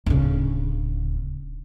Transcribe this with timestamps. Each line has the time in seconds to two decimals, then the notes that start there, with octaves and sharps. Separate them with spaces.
0.06 D1 C#3